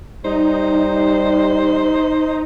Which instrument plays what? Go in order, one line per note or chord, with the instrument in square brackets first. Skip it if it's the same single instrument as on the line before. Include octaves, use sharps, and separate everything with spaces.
[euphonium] G3 [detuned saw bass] D#4 [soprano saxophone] C5